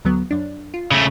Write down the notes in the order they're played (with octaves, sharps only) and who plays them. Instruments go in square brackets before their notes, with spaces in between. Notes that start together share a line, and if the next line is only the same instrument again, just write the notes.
[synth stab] D2 F#3 B3
F#2 D4
F4
[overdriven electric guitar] C#3 A3